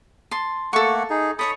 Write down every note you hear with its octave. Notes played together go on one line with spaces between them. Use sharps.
A5 C6
A3 A#3 A4 F#5 C#6
D#4 G#4
A4 C#5 B5 C#6 D#6